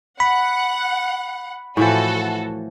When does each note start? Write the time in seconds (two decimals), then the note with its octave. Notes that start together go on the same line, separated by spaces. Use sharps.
0.20 F#5 B5
1.77 A2 E3 F3 F#4 A4